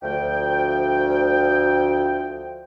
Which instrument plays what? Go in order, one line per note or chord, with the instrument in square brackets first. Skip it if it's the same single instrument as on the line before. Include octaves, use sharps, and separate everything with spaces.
[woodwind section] D2 F3 G5